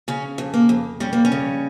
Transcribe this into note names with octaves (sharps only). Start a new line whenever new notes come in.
C#3 C#4
F2
A#3
F2
G3 C#4
A#3
C#4
C#3